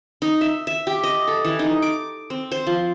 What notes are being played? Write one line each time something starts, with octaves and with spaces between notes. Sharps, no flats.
D#4
E5
E5
G4
D#5
A4
E3
D#4
D6
C4
C5
F3